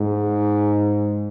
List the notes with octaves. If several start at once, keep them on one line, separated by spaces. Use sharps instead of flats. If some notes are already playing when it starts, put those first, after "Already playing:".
Already playing: G#2